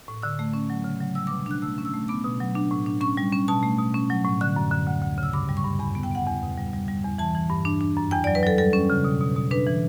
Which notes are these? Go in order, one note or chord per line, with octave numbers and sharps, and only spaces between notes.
A2
D3 E6
A3
C#4
F#3
C#3
F#3
G3 E6
B2 D6
D4 F#6
A3 E6
C#4
E6
A3
B3 D6
B2
F#3
D4
A2
D4
C#4 C#6
G3
C#4
B2 A5
A3
B2
C#4
F#3
A2
D3 F#6
F#2
D3
D2
D2
C#3
E6
G2 D6
G3
C#6
G2
E2 B5
B3
G5
B3 F#5
E2
B2
G3
G3
G3
E2
E3 A5
E3
G2
D4
D4
F#2
E2 G5
F#3 D5
B4
F#3 A4
G3 A4
C#4
C#3
B2
B2
B2
D4 B4
E3